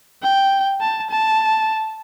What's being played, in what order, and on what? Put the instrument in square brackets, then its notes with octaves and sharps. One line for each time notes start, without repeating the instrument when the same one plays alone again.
[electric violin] G5
A5
A5